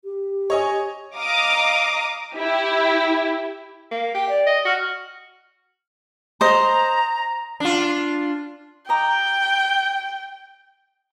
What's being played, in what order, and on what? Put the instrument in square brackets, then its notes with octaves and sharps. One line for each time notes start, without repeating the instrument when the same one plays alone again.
[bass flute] G4
[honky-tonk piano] C#5 D#5 G#5
[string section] D#5 F5 A#5 D6 D#6
E4 G4
[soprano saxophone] A#3
[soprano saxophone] G4 [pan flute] G5
[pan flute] D5
[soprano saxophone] D#5
[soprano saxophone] F#4 [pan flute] F6
[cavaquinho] C5 D#5 [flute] A#5
[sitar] D4 F4
[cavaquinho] D#5 A#5 D6 [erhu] G5